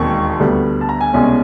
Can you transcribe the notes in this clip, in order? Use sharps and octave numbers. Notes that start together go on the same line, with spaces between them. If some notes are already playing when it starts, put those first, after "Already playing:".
Already playing: E1 D#2 D#3 G#3 C4 C#6
D2 D3 G3 B3
A5
A#5
G#5
C2 B2 G#3 C#4